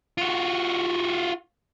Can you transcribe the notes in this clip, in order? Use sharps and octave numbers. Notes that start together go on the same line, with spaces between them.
F4 F#4